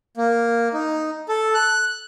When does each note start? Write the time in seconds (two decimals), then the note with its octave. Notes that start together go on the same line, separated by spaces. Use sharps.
0.17 A#3
0.73 D#4
1.29 A4
1.54 F#6